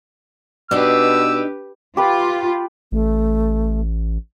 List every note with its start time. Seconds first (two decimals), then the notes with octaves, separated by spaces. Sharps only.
0.71 B2 D4 D#4 G4 B4 E6
1.97 F4 G4 B4
2.92 A1 A3